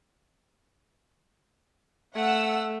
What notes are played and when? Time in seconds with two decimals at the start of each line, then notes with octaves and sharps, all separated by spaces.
2.15 A3 F#5 E6